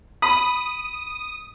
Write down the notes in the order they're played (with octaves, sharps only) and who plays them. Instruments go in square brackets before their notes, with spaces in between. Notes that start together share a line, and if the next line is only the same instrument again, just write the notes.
[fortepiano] B5 [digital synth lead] D#6